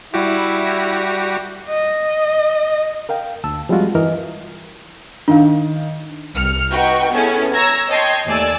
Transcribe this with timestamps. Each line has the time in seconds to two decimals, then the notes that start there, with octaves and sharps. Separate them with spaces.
0.14 G3 E4 F#4 G4
1.70 D#5
3.09 A#4 F5 G5
3.44 D2 A5 E6
3.69 F3 G3 G#3 C4 F4 F#4
3.95 G2 E3 A#4 D#5 F6
5.28 D#3 D4 F5
6.36 C2 F6 C#7
6.71 D#4 F#4 B4 F#5 G5 C#6
7.12 B3 C#4 E4 G#4 A4
7.54 C#5 A#5 E6 G#6 A#6
7.88 C#5 D#5 G5 A5 C6 G#6
8.27 D#2 A3 D5 G#5 E6